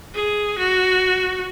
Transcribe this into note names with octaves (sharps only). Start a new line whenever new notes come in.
G#4
F#4